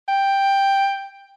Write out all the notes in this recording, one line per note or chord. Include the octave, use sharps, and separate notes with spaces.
G5